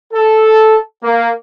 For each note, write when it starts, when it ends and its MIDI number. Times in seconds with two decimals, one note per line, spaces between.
0.13 0.77 69
1.04 1.29 58